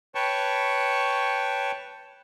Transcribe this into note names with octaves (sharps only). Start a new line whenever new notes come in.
B4 C#5 G5 A5 C#6